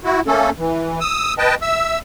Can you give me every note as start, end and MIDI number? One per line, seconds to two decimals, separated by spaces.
0.04 0.20 64
0.04 0.20 66
0.27 0.50 57
0.27 0.50 58
0.27 0.50 61
0.27 0.50 69
0.59 1.00 52
1.00 1.34 87
1.00 1.34 88
1.38 1.55 71
1.38 1.55 75
1.38 1.55 79
1.38 1.55 81
1.62 1.99 76
1.62 1.99 88